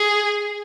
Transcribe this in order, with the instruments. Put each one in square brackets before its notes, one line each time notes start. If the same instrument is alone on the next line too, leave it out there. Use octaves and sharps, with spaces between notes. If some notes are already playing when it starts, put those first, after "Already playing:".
Already playing: [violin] G#4